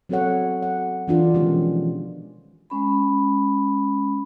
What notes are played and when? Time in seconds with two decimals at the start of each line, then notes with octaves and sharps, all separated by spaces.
0.09 F#3 C4 F#4 A4 C#5 F#5
0.62 F#5
1.08 E3 D4 F4
1.34 B2 D#3 F3 G#3 C#4 G4
2.70 G#3 C#4 B5